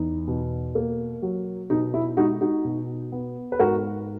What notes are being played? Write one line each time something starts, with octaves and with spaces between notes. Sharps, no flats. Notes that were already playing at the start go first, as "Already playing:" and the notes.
Already playing: E2 D#4
B2
A#3
F#3
B2 D#4
E4
G#3 D#4 F#4
D#4 F#4
B2
B3
B4
G#2 F#4 A#4